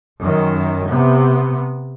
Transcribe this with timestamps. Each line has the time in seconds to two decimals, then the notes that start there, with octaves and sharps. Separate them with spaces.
0.21 F#2 D#3
0.88 C3 B3